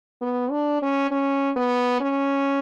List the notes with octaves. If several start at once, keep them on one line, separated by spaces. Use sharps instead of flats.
B3
D4
C#4
C#4
B3
C#4